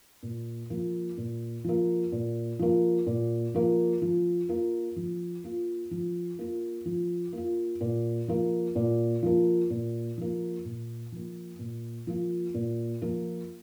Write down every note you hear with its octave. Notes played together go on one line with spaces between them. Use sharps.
A#2
F3 A#3
A#2
F3 A#3
A#2
F3 A#3
A#2
F3 A#3
F3
A#3 F4
F3
A#3 F4
F3
A#3 F4
F3
A#3 F4
A#2
F3 A#3
A#2
F3 A#3
A#2
F3 A#3
A#2
F3 A#3
A#2
F3 A#3 F4
A#2
F3 A#3 F4